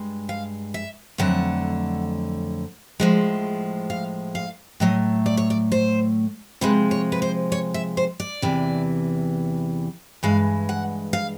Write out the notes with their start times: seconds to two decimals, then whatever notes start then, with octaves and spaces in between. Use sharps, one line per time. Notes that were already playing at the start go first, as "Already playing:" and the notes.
Already playing: G2 G#3
0.29 F5
0.74 E5
1.18 F2 D3 F#3 A3 F#5
3.00 A2 F3 G#3
3.90 F5
4.35 F5
4.80 A2 F#3 A3 D#5
5.26 D5
5.37 C#5
5.50 D5
5.72 C5
6.61 C3 F3 G#3 B4
6.91 C#5
7.12 B4
7.22 C5
7.52 C#5
7.74 E5
7.97 C5
8.20 D5
8.42 E2 C3 E3
10.23 G2 E3 G#3 F5
10.69 F#5
11.13 F5